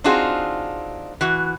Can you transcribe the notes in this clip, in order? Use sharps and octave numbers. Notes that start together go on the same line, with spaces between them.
C4 D4 D#4 F4 F#4 G#4
E3 F#4